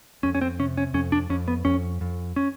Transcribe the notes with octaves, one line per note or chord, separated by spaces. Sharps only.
F2 C#4
C#4
C4
C3 C#4
C#4
F2 C#4
D4
F2 C#4
B3
F2 C#4
F2
C#4